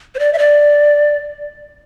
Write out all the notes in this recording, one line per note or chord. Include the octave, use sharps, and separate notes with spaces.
C5
D5
E5
D5